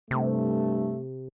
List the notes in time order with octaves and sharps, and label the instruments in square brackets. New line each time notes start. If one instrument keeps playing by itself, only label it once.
[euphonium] G2 [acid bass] C3 [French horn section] A3